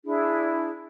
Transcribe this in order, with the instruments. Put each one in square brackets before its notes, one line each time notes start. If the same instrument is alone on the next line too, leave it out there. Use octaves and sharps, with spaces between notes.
[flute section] D4 E4 G#4